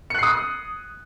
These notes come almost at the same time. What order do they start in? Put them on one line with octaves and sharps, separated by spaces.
C#7 F#6 C7 D#6